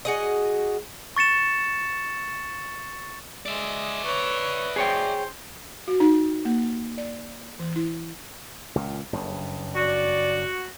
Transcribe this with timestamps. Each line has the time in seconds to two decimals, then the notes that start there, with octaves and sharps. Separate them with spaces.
0.05 F#4 G#4 D#5
1.16 C#6 A6 C#7 E7
3.46 G#3 D5 E5
4.05 B4 C#5
4.76 G#4 C5 C#5 G5
5.88 F#4
6.00 D#4
6.45 A#3
6.98 D5
7.59 E3
7.76 E4
8.76 C#2 A#2
9.13 F#1 G2 C#3
9.75 F#4 D5